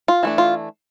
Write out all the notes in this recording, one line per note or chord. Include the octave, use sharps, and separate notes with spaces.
F4
E3 A3 D4
F4